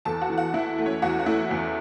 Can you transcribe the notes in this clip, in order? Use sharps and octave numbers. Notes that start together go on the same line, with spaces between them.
E2 A4 A5
F#4 F#5
E3
F#4 F#5
E3 E4 E5
A3
C#4 C#5
E2 F#4 F#5
F#5
A3 E4 E5
E2